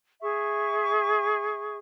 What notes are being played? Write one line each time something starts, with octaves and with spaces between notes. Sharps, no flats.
G#4 E5 C#6